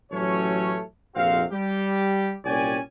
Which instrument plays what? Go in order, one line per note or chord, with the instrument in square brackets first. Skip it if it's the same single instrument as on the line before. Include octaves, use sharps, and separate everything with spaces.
[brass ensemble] A1 F#3 A3 C#4 C#5
A#1 F2 C3 C4 F#4 F5
G3 G4
C2 A#2 C#4 D5 G5 G#5